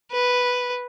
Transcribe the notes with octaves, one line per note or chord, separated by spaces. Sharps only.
B4